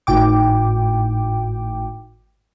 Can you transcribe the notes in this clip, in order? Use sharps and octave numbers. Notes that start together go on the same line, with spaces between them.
G#1 A2 G5 D6